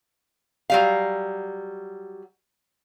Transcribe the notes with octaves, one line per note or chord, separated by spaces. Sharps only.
F#3 G3 F5